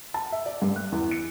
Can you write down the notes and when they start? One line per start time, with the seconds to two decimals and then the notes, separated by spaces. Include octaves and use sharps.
0.14 A5
0.32 E5
0.46 D5
0.62 G2
0.76 F#6
0.92 E2
1.11 C#7